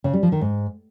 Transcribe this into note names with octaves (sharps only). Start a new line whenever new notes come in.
C#3
G3
F3
D#3
G#2